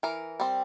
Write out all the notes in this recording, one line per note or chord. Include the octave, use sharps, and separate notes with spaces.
E3 A#4
G3 C4